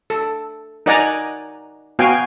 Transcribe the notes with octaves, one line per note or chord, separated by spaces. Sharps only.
A4
D#4 A#4 D5 F#5 G#5 A#5
B3 F#4 F5 G5 G#5